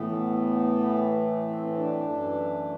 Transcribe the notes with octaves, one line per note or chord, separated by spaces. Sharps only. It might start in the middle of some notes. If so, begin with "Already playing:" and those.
Already playing: A2 E3 A3 B3
C4
C4
D4
F#2 E3 A3